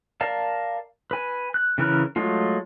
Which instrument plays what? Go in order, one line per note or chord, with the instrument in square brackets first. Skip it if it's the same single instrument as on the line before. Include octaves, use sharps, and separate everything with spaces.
[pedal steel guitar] A#4 D5 F5 A5
B4 G#5
F#6
C#3 E3 C#4 A#4 F#6
F#3 G#3 A3 F4